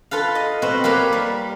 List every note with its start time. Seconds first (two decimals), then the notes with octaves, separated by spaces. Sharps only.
0.11 F4 A4 B4 F5
0.35 D#5
0.62 B2 C4 B4
0.84 A#3 G4 A#4 B4 C#5
1.13 G3